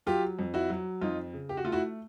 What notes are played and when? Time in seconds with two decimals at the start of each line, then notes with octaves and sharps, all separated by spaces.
0.06 F#3 F4 G4
0.39 F2
0.54 E4 F#4
0.70 F#3
1.01 F2 D#4 F4
1.33 C#3
1.49 G4
1.57 F#4
1.65 A3 F4
1.72 E4 F#4